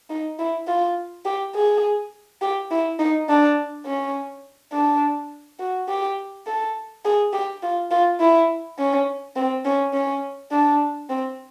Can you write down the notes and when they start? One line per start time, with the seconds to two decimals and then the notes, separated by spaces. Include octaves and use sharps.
0.10 D#4
0.39 E4
0.68 F4
1.25 G4
1.55 G#4
2.42 G4
2.71 E4
2.99 D#4
3.29 D4
3.86 C#4
4.73 D4
5.60 F#4
5.88 G4
6.46 A4
7.05 G#4
7.33 G4
7.63 F4
7.91 F4
8.20 E4
8.78 C#4
9.36 C4
9.65 C#4
9.93 C#4
10.51 D4
11.09 C4